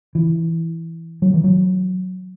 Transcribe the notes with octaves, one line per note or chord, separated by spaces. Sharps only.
E3
F#3
E3
F#3